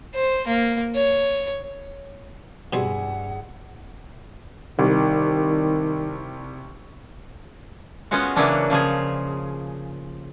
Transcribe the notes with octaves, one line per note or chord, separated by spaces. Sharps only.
C5
A#3
C#5
G2 B2 G3 C4 E4 G#4 F#5
C2 D#3
G#3 B3 C#4 F4 F#4
C#3 E3 F#3 A#3 C#4 D4
C#3 F3 F4 G#4